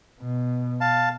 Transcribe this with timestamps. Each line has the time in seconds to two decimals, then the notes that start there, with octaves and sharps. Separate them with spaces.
0.20 B2
0.81 F5 A5